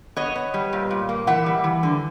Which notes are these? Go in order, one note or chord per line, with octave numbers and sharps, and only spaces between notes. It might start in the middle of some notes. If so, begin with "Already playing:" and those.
B3 C#5 D#5
B3
G3
A#2
A#2
A#3
E3 E5 F#5
G3
E3
D3